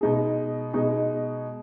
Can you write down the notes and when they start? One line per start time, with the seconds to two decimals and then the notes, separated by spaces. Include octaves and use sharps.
0.01 B2 G#3 D#4 G#4
0.73 B2 G#3 D#4 G#4